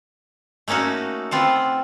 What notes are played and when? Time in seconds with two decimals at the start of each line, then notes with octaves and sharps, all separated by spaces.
0.68 A3 A#3 C#4 D#4 F#4
1.31 B3 C4 F4 A4